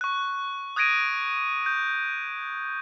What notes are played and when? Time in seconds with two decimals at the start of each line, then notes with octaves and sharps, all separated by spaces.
0.01 C#6 F#6
0.76 D#6 F#6 G#6 A#6 D7 D#7
1.66 G6